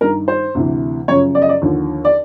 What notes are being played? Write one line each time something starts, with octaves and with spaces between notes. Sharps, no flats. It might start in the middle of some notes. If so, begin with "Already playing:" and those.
G2 D#3 A#4
C5
D2 C3 E3
F#2 C#3 F3 C#5
D5
D#5
D5
D#2 D3 F3
D5